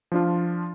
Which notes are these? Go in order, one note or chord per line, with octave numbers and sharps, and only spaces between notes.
F3 D4 F4